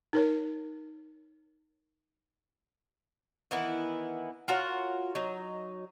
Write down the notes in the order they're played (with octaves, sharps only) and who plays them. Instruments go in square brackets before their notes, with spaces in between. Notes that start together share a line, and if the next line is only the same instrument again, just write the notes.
[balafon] D#4 A#4 C#5
[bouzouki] D#3 E3 B3 E4
F4 F#4 A#4 C#5
F#3 D#4